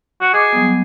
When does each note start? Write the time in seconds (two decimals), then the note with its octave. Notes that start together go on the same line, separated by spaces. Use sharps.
0.21 F#4
0.34 G#4 D#5 D6 D#6
0.53 F#3 G3 B3